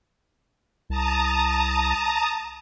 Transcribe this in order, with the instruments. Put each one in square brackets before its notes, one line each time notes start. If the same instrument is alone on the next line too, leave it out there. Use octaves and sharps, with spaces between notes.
[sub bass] C2 [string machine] A5 A#5 D#6